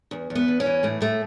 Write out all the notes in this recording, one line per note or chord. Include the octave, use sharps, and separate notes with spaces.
E2
E2
B3
E2
C#4
E3
A2 A3
A2 A3